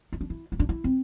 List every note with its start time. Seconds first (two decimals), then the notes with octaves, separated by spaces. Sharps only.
0.12 E4
0.21 D4
0.30 E4
0.52 E4
0.59 D4
0.69 E4
0.84 C4